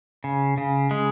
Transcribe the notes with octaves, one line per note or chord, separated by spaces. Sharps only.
C#3
C#3
G#3